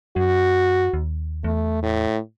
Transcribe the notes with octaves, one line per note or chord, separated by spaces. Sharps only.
F#2 F#4
D#2
E2 A3
A2